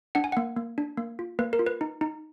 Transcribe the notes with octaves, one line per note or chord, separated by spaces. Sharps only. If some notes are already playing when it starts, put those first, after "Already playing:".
D4 F#5
G#5
A#3 F#5
A#3
D4
A#3
F4
A#3 B4
A#4
F4
B4
D#4
D#4